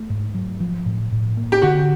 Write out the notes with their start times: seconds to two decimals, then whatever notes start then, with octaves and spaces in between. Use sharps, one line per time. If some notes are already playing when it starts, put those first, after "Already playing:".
Already playing: A3
0.10 G#2
0.34 F#3
0.60 F3
0.86 A2
1.12 A2
1.37 A#3
1.52 G4
1.62 D3 F#4